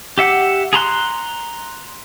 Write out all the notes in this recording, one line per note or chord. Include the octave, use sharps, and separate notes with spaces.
G4 E5 F#5
G#4 A#5 C6 F#6